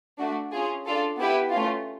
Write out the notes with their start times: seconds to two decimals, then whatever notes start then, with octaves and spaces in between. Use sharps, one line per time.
0.19 A3 D4 F#4
0.53 C#4 F4 G#4
0.86 D4 F4 A4
1.19 B3 E4 G4 B4
1.52 A3 C#4 F4